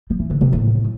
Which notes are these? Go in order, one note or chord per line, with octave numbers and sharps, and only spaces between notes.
F3
E3
D3
C3
A2